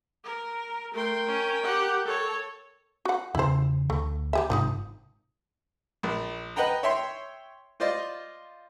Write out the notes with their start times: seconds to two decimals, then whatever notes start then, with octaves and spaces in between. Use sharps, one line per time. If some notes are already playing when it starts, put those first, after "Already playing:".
0.24 A#4
0.94 A3 A#4 G5 C6
1.26 C#4
1.63 G4 F#5
2.05 A4 C#5
3.05 F#4 F#5
3.35 E2 C#3 E4 C5
3.90 D2 A3
4.33 G4 G#4 E5
4.50 G#1 G#2 C3 F3 B3 D#4
6.03 A#1
6.56 B4 D#5 F#5 G5 A#5
6.83 C#5 E5 G5 C6
7.80 F4 C5 D5 D#5